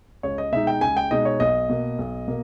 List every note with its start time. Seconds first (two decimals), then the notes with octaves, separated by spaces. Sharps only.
0.23 C#2 C#5
0.38 D#5
0.52 B2 G#3 D#4 E5
0.67 G5
0.81 C#2 G#5
0.97 G5
1.11 B2 G#3 D#4 D#5
1.25 C#5
1.40 B1 D#5
1.69 B2 A#3
1.99 B1
2.28 B2 A#3